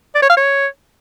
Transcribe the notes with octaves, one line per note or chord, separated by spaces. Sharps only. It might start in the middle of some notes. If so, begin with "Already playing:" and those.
D5
C#5
F5
C#5